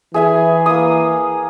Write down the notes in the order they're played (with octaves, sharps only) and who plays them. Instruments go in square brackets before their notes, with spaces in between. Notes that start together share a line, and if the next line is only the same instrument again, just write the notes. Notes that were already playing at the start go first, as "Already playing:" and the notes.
[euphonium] E3 [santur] G#4 E5 G#5
[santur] A#3 D#6